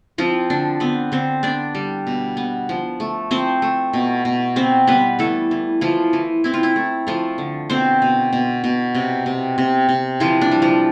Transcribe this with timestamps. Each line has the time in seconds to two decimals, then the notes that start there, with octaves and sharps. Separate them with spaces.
0.18 F3 C4 F4
0.50 D3 D4
0.80 B3 C4 B4
1.12 D3 C4 C5
1.43 B3 D4 D5
1.75 G3
2.07 B2
2.37 B3
2.69 F3
3.00 A3
3.31 F3 C4 C5
3.62 A3
3.93 B2
4.25 B2
4.56 B3 C4 C5
4.87 G3 B3 B4
5.19 E3 A3 A4
5.51 E3
5.81 E3 F3 F4
6.13 E3
6.44 C4 E4
6.54 F4
6.63 E4
6.76 A3
7.07 F3 A3 F4
7.38 D3
7.70 B2 C4 C5
8.02 B2
8.33 B2
8.64 B2
8.95 C3
9.26 C3
9.58 C3
9.89 C3
10.20 E3 F3 F4
10.41 D4
10.52 G3
10.62 F3 F4